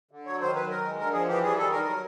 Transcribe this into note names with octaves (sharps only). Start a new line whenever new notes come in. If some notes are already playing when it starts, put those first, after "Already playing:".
D3
F#3 C#5
D#3 C5
F#3 B4
D#3 A#4
G#3
D3 A#4
F3 G#4
E3 G4
G3 G#4
D#3 A4
G3 A#4
F#3